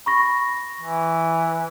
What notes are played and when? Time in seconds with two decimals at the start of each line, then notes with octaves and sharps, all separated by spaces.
0.06 B5 C#6 A#6
0.81 E3